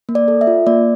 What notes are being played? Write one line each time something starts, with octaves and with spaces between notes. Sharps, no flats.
A#3
D5
A4
E5
F4
A#3 D5